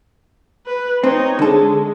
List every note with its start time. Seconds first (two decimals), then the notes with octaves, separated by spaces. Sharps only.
0.66 B4
1.04 C4 D#4 C#5
1.39 D3 G#3 A4